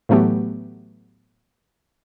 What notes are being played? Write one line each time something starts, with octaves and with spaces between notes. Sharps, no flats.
A2 E3 F#3 A3 B3 G4